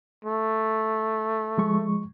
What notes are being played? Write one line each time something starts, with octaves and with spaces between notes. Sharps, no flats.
A3
F3 G#3 C#6